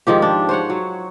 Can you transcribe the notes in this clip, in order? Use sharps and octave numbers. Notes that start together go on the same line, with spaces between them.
G#2 D#3 F3 G4
D4
C5 C#5 F#5
F#3